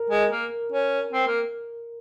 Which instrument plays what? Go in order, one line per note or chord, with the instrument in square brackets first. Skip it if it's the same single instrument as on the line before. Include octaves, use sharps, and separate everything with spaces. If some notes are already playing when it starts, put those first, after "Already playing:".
Already playing: [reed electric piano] A#4
[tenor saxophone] G#3
A#3
C#4
C4
A#3